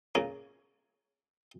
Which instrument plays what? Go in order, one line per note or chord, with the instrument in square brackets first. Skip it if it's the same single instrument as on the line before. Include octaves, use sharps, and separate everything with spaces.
[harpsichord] A#2 C#3 C#4 A#4 G#5